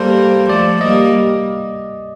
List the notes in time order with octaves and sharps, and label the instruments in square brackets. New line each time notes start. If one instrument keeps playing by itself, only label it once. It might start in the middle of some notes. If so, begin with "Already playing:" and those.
Already playing: [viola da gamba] G3 A#3 [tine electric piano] A4 C5
[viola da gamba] F3 A3 [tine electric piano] D5
[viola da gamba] G3 A#3 [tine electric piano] D#5